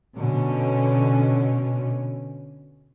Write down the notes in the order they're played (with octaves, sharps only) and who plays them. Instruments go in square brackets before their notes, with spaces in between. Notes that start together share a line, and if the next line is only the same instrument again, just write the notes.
[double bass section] B2 D3 C#4